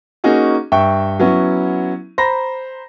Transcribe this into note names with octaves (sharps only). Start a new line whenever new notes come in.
A#3 C#4 D#4 F#4 G#4
G2 E5 G5 C#6
F#3 B3 C#4 E4
C5 A#5 B5 A#6